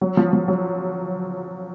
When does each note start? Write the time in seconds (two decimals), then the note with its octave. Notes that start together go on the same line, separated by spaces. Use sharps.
0.01 F#3
0.17 F3
0.33 F3
0.48 F#3